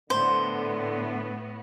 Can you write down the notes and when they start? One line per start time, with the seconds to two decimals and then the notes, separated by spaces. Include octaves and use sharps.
0.10 A2 D3 B3 C5